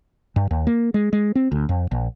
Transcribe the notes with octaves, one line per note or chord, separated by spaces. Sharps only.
G2
D#2
A#3
G#3
G#3
C4
D2
F2
A#1